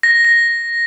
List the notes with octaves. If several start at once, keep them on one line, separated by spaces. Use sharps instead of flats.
A#6
A#6